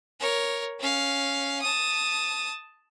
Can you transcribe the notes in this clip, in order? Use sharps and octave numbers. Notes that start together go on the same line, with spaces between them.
A#4 C#5
C#4 F5
A5 D#6